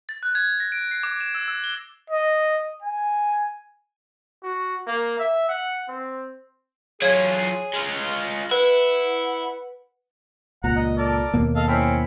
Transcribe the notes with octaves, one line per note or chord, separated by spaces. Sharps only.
A6
F#6
G#6
A#6
D7
C7
D6
E7
E6
E6
G7
D#5
G#5
F#4
A#3
E5
F#5
C4
F#3 F4 G#4 C#5 G#6
G#3 F4
E4 B4 F#5
C#2 A#2 F#5 A#5
D#5
A4 A#4 D5
D#2 B2 A#3
A4 D#5 F5
C4 C#4 E4